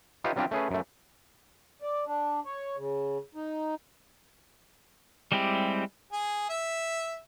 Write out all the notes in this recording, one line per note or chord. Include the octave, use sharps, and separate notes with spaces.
D#4 F4 G4 B4 C#5 E5
F#3 G3 C4 D4 F4 G4
A3 C#4 G#4 B4
F#2 A3
D5
D4
C#5
C#3
D#4
G3 G#3 C4 E4 G4
G#4
E5